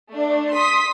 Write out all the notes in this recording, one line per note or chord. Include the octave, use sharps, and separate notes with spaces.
A3 D4
C6 D#6 B6